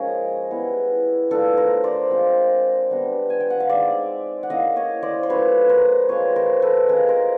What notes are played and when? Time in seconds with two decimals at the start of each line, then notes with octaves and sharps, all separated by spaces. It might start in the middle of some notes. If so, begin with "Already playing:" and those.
Already playing: F3 G#3 A#3 C#4 D#4 G#4 A#4
0.50 G3 B3 E4
1.30 A3 D4 F4 A4 B4
1.57 A#4 C5
1.84 C5 D5
2.11 G#3 C4 F4
2.91 G3 B3 D4
3.30 G#5
3.40 G5
3.50 F#5
3.60 F5
3.69 G#3 C4 D#4 D5 E5
4.43 F#5
4.50 A#3 C#4 E4 D#5 F5
4.76 C#5 D#5
5.03 C5 D5
5.23 C5
5.29 F#3 A3 C#4 F4 B4 C#5
5.69 A#4 C5
6.09 G#3 C4 F4 B4 C#5
6.36 A#4 C5
6.62 A4 B4
6.89 G#3 C#4 F4 G#4 A#4
7.08 A#4 C5